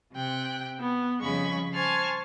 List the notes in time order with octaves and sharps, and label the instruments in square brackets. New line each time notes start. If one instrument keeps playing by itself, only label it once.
[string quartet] C3 G5 F#6
B3
F2 C#3 G3 G#3 B5 C#6
C5 G#5 A5 C#6 F6 G#6